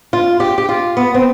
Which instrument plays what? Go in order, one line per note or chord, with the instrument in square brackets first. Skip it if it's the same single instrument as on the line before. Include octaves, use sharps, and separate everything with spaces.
[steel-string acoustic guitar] F4
G4
G4
F4
B3
C4